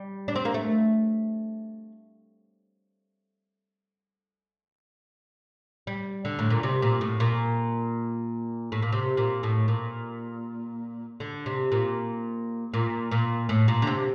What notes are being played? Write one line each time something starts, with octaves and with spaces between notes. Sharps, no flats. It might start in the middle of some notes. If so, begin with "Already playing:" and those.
Already playing: G3
D4
C4
A#3
A3
G3
D3
A2
A#2
C3
A#2
A2
A#2
A2
A#2
C3
A#2
A2
A#2
D3
C3
A#2
A#2
A#2
A2
A#2
D3
C3